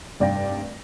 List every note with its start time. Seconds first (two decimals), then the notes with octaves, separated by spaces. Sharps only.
0.20 F1 G2 D5 F5 G5 A#6